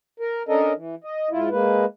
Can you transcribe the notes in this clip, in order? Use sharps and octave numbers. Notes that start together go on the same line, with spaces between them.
A#4
C#4 D4 A4 A#4 D#5
E3
D#5
G#2 E4 F4
G#3 A#3 B4